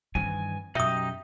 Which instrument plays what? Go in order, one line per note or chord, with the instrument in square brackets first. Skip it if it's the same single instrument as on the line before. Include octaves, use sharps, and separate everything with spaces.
[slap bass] G2 D#3 E3 [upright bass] C4 [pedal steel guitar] G#5
[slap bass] F#2 B2 [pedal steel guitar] D#4 G4 D#5 [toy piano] E5 D#6